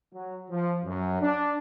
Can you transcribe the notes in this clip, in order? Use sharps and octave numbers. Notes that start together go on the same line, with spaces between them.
F#3
F3
F#2
D4